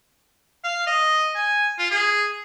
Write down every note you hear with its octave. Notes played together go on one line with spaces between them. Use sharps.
F5
D#5
G#5
F4
G#4